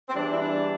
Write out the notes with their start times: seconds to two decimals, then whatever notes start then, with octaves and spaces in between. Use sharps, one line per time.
0.09 C4
0.13 E2 E3 G3 D4
0.31 E4
0.41 D4